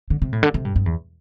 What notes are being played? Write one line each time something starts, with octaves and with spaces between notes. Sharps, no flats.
D3
C3
A2
D3
C3
G2
G2
E2